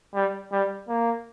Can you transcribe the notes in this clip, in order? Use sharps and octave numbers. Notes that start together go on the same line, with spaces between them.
G3
G3
A#3